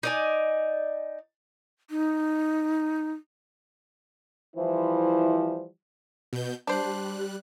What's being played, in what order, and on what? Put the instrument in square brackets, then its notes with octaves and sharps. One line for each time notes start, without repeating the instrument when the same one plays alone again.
[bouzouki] D#4 D5 G#5
[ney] D#4
[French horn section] E3 F3 G3 E4 C5
[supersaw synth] B2 G6
[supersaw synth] G3 F#6 [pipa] D4 C5